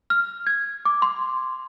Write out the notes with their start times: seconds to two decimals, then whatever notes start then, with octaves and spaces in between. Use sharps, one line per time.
0.10 F6
0.47 G#6
0.85 D6
1.02 C6